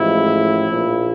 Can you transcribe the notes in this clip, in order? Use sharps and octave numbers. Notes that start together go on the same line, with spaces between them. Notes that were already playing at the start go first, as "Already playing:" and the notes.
Already playing: A1 A2 F3 G#3 E4
A#1 A#2 F3